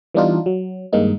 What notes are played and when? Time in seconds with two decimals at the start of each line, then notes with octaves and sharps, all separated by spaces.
0.14 E3 G3 B3 D4 D#4 F4
0.46 F#3
0.93 G2 D#3 G#3 A#3 D#4